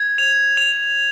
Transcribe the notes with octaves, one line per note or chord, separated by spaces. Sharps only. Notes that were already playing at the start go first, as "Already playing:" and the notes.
Already playing: G#6
F7
F7